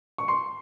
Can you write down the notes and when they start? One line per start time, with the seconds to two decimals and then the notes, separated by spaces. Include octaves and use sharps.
0.18 C#6
0.28 C6